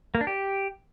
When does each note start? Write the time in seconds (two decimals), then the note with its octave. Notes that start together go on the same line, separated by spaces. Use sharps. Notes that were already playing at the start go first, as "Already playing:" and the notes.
0.15 A#3
0.21 D4
0.27 G4